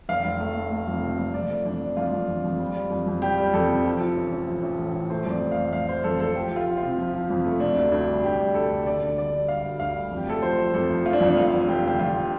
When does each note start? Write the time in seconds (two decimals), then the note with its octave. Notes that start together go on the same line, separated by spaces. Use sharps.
0.09 F1 F5
0.25 F1
0.40 A3
0.56 A3
0.71 A3
0.88 F2
1.03 C3
1.18 F1
1.34 F2 D5
1.50 A3
1.65 F2 D4
1.82 F3
1.97 F2 F4
2.12 F2
2.28 F2
2.44 F2
2.59 G3
2.75 G3
2.90 F2
3.07 F2
3.22 G3 G4
3.38 G3
3.53 F2 A4
3.68 C3
3.85 F3
4.00 F3
4.16 A1
4.32 A1
4.47 F3
4.63 A1
4.78 A2
4.94 A1
5.10 A3 C5
5.25 F2 D5
5.42 A3
5.52 F5
5.57 F1
5.73 F1 F5
5.88 A3 C5
6.04 F2 A4
6.20 F1 A4
6.35 F3 G4
6.52 F3 F4
6.66 F3
6.77 F4
6.83 C3
6.98 F3
7.14 F3
7.30 F2
7.45 A3
7.60 C3 D4
7.76 D2
7.92 D2 D4
8.08 G3
8.24 D2 G4
8.39 G3
8.55 D2 A4
8.71 D2
8.86 D3 D5
9.02 D3
9.17 G3 D5
9.33 D3
9.48 G3 F5
9.64 D2
9.80 D2 F5
9.96 G3
10.11 F2
10.17 G4
10.27 A3 A4
10.42 F3 C5
10.58 F3
10.74 F2 A4
10.90 F3
11.05 A3 F4
11.13 D4
11.20 F2
11.29 D4
11.36 F1 F4
11.52 F1
11.68 F1 G4
11.84 D3 G4
11.99 F1 F4
12.16 D3